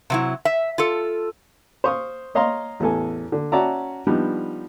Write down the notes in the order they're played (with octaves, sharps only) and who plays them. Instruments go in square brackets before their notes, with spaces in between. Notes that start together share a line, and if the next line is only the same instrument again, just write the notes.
[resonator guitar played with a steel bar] C3 F#3 E4
E5
F4 A4
[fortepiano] C5 F5 C#6 D#6
C#5 D#5 F5 A#5 C6
A1 E2 A4 G#5
D3
C#4 F#4 D5 E5 A5 A#5
F3 G3 B3 D4 D#4